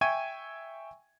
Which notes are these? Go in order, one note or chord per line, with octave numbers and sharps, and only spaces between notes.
E5 G5 G#5 C#6 G#6 D#7